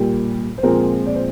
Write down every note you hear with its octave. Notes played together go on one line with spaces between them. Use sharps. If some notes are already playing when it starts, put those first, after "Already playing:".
Already playing: A#2 G3 A#3 G4
C5
A#2 F3 G#3 C4 A#4
D5
C5